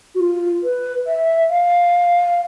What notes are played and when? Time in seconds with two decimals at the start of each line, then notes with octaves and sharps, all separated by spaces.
0.15 F#4
0.20 F4
0.63 B4
1.07 E5
1.50 F5